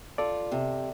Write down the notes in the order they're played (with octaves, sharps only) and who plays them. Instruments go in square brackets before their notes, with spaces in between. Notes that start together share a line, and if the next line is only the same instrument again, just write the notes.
[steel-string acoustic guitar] F4 [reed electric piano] A4 D5
[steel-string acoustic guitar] C3